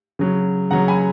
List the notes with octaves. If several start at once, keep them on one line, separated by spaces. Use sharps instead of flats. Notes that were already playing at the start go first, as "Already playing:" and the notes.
C#3 F#3
C#3 F#3 F#5 A#5
G#5 B5